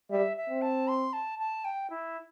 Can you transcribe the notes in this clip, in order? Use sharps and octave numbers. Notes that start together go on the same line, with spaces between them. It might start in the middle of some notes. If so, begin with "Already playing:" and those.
G3 E5
E5
C4
A5
C6
A5
A5
G5
E4